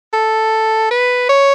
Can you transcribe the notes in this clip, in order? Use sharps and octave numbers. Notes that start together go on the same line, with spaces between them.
A4
B4
C#5